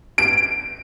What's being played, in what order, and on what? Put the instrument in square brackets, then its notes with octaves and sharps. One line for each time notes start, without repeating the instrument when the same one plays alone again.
[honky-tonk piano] D7